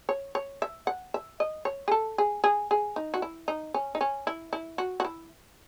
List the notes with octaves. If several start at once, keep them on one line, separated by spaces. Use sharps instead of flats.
C#5
C#5
E5
F#5
E5
D#5
C#5
G#4
A4
G#4
G#4
G#4
D#4
F#4
E4
D#4
C#4
D#4
C#4
E4
E4
F#4
F#4
E4